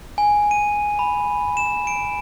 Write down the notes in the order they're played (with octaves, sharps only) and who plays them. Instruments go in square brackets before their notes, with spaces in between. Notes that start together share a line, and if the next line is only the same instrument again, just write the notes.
[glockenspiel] G#5
D#7
B5
E7
D7